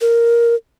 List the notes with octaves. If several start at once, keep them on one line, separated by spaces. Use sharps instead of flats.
A#4